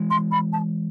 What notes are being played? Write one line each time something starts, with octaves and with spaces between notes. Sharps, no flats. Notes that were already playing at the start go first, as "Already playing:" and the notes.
Already playing: E3 G#3
C6
B5
A5